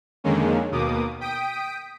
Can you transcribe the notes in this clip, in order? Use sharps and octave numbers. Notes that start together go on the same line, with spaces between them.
F2 D3 D#3 G#3 A#3 C#4
D#2 B2 A#3 D6 D#6
G5 D#6 B6 D7